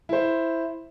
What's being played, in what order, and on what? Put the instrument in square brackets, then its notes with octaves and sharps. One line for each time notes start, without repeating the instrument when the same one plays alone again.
[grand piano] E4 C5